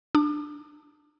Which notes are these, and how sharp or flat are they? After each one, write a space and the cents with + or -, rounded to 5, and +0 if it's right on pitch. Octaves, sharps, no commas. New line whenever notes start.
D4 +15 D6 +40